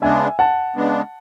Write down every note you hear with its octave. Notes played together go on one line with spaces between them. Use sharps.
C#3 G#3 B3 D4 E5 G#5
F#5 A5
C#3 G#3 B3 D4